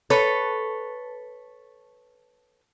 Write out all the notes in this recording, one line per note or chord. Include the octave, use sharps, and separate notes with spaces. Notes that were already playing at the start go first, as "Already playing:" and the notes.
A4 B4 C#5